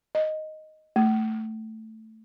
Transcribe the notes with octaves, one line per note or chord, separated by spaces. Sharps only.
D#5
A3